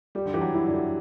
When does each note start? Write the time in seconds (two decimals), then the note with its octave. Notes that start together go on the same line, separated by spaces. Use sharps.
0.15 G3 G4
0.26 D3
0.33 E3 G4
0.41 F#3
0.54 E4
0.67 D3
0.74 G4